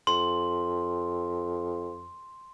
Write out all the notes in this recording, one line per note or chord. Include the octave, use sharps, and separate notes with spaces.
F2 C6